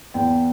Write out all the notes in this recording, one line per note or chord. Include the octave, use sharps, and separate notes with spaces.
E2 G5